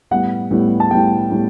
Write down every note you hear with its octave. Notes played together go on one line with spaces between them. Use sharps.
A2 G3 B3 F#5
A2 G3 B3
A5
A2 G3 B3 G5
A2 G3 B3